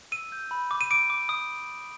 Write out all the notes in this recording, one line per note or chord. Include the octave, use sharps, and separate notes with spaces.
E6 D#7
G6
B5
D6
D#7
D6 D7
D6
D#6